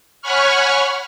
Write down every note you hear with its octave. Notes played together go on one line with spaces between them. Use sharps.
C#5 F#5 G#5 B5 C#6 F6